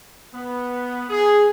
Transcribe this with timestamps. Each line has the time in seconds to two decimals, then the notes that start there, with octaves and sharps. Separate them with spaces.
0.34 B3
1.10 G#4